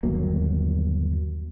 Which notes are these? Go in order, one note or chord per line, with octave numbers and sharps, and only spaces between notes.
G1 D#2 F#3 A#3